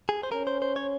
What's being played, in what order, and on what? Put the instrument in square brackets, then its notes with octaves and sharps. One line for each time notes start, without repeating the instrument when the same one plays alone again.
[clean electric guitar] G#4
C5
[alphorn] C#4 [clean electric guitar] A#4
[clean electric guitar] C5
C5
C#5